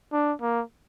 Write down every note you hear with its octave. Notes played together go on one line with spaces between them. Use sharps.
D4
A#3